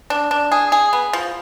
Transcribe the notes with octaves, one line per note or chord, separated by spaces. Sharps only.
D4
D4
G#4
G#4
B3
F3